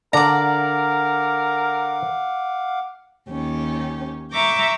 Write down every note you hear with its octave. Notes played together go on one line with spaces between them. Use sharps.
D3 D4 A#4 D5 F5 F#5 A#5 D6
D#2 C#4 G4
E5 A#5 C#6 D6 G6